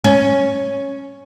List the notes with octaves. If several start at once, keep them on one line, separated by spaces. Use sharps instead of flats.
C#4